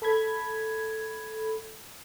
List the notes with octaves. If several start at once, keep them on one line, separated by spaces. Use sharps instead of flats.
A4 B5 G#6